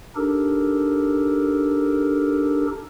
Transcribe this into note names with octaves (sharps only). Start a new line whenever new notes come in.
D4 D#4 G4 A4 A#4